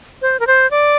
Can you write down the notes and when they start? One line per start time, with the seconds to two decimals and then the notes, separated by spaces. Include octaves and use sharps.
0.22 C5
0.40 A#4
0.47 C5
0.71 D5